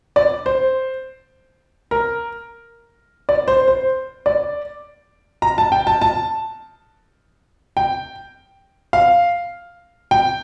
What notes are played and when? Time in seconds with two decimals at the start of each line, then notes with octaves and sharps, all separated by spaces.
0.16 D5
0.46 C5
1.91 A#4
3.29 D5
3.48 C5
3.68 C5
4.26 D5
5.42 A#5
5.58 A5
5.72 G5
5.87 A5
6.01 A5
7.77 G5
8.93 F5
10.11 G5